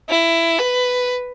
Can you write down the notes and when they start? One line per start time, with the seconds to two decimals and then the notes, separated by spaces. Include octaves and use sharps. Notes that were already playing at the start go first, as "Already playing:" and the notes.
0.09 E4
0.58 B4